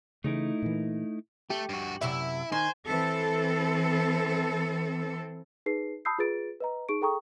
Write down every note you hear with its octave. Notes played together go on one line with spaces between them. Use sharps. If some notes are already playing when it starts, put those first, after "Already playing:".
C#3 E3 A3 D#4 E4
A#2 E3
A3 G4
G2 F#4
F#2 C3 E4 E5
D#3 D#4 C5 G#5
E3 C4 A4
D#4 G#4 B4 C7
A5 B5 D#6 E6 G6 C7
F4 G#4 B4 A6 D7
B4 D#5 A#5
D#4 G#4 C#6 D7
G#4 A4 G5 A#5 C#6 D#6